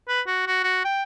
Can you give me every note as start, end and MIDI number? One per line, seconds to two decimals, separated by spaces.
0.08 0.21 71
0.27 0.43 66
0.47 0.60 66
0.64 0.80 66
0.84 1.03 79